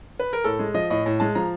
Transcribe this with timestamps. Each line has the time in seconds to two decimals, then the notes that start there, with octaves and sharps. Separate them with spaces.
0.19 B4
0.33 A#4
0.44 A2 A4
0.59 G#3
0.74 F3 D#5
0.90 A2 D#5
1.06 A2
1.20 G#3 A5
1.35 F3 A#5